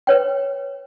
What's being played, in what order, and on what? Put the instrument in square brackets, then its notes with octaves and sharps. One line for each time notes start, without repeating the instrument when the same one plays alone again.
[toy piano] B4 C#5 G5